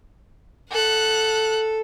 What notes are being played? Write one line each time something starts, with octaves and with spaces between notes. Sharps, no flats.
A4 F#5 F#6